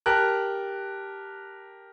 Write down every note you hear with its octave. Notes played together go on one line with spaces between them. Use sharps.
G4 A#4 A5 F#6